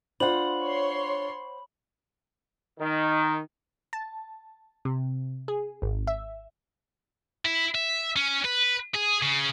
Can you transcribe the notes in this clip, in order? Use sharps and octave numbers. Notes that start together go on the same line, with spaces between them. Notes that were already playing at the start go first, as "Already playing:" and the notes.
D4 F4 C5 F#5 B5 F#7
C#5 C6
D#3
A5
C3
G#4
G#1
E5
E4
E5
C#4
B4
G#4
C#3